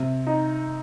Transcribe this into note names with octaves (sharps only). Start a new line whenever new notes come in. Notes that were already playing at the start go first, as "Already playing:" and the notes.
Already playing: C3
D#4